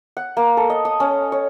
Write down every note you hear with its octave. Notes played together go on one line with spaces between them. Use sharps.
F#5
A#3
A4
D#5
D#6
C#4
C#5